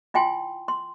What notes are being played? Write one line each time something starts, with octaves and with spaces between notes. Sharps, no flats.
E4 F4 G5 G#5 C6
C6